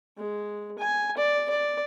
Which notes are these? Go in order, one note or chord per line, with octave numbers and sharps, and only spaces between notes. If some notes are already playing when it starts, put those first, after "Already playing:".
G#3
G#5
D5
D5